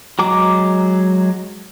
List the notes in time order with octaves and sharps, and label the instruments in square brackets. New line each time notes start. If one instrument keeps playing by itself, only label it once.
[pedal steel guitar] F#3 G#3 A#5 D6